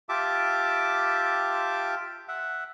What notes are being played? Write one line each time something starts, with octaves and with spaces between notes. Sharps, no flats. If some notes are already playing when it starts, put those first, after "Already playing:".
F4 G4 E5 A5 D6
E5 F#5